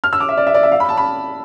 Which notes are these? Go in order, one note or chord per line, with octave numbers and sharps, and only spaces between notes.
F6
E6
D6
E5
D5
E5
D5
E5
F5
B5
A5
B5